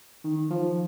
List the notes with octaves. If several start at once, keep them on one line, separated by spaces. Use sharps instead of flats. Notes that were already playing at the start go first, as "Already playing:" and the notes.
D#3
F3